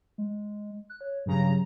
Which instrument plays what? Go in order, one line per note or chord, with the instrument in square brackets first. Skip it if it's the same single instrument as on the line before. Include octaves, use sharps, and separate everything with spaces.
[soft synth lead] G#3
F#6
C#5
[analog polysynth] G2 C#3 A#5 [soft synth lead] F#3